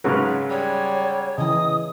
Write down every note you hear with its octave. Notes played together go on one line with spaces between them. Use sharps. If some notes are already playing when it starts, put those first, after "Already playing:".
G#2 C#3 F#3 A#4 B4
G3 C#5
C#3 E3 D#5 D#6